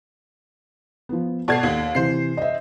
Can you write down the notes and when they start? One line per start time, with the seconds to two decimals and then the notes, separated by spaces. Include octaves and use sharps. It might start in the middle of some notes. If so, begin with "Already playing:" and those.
1.09 F3 B3
1.48 B2 A4 D5 A5 G#6 C7
1.63 D#2
1.95 C3 E3 C5 C7
2.37 D#5 E5